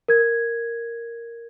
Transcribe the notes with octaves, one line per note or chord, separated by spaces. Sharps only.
A#4 G#6